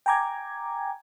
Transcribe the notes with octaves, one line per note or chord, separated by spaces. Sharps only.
G5 G#5 A#5 D6 G#6